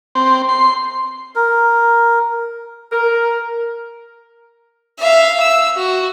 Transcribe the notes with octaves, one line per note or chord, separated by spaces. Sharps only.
C4
C6
A#4
A#4
E5 F5
E6
F#4